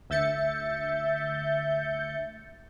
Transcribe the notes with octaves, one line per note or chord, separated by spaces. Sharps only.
D2 E5 G6 A6 C#7